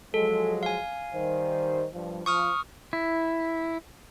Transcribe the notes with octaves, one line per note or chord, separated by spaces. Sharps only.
F3 F#3 G#3 A4
F5 G#5
D#3 G3 C5
G2 F3
F3 C#6 D#6 F6
E4